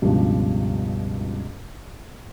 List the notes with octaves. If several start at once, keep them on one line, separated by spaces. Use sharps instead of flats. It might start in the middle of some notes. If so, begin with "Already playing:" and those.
C#2 G2 B2 F3 G3